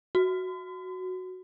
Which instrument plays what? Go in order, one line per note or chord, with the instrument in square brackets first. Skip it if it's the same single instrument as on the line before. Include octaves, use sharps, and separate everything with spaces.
[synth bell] F#4